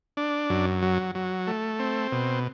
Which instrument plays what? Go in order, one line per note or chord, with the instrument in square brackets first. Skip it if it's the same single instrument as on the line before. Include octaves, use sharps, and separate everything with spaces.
[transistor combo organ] D4
F#2
F#3
F#3
A3
C4
B2